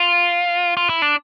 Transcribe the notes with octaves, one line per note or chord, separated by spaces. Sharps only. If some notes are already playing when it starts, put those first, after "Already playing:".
Already playing: F4
F4
E4
D4